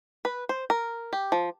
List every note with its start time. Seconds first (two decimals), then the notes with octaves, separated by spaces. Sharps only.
0.25 B4
0.49 C5
0.70 A#4
1.13 G4
1.32 F3